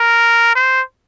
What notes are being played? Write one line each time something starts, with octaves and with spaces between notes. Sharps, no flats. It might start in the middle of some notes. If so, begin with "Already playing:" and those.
Already playing: A#4
C5